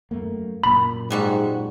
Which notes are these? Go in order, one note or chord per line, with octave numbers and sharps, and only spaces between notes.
F#2 A3 A#3
F#2 A#2 A#3 B5
G#2 F#3 G3 F#4